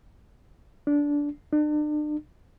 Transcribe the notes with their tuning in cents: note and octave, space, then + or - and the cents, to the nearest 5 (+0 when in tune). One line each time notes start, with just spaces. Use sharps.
D4 -15
D4 +40